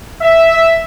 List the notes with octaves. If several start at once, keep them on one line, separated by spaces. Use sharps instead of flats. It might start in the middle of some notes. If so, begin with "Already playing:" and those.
E5